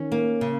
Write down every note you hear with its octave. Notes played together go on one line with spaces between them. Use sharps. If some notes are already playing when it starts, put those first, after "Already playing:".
Already playing: D#3 C#4
A#3
C#3